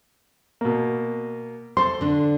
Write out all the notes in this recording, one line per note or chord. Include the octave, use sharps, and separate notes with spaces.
B2 A#3
A4 C5 C6
D3 D4